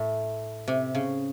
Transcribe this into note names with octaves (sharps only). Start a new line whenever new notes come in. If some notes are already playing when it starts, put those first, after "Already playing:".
Already playing: A2
C3
C#3